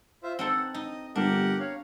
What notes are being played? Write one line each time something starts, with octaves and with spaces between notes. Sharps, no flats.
F4 C5 E5
C4 D#4 A4 F#5
D#4 D#5
G1 D4 G4 A#4 F#5
C#5 F5